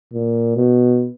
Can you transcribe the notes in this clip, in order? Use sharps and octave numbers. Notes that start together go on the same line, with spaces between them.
A#2
B2